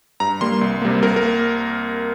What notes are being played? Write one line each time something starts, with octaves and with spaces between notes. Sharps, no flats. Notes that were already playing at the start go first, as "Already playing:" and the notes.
G2 A#5
G3 A#3 C6
C2
C3 G3 A#3
C2 A#4
A#4
A#3